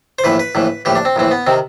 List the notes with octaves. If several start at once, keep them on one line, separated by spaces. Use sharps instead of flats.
C5
A#1 A2 E3 B4
B4
A#1 A2 E3
A#1 A2 E3 G4
D4
C4
A#1 A2 E3 C4
B3
C3 D#3 C4